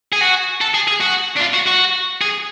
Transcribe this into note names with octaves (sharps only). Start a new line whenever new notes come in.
G#4
F#4
A4
G#4
G#4
F#4
D4
F4
F#4
F#4
G#4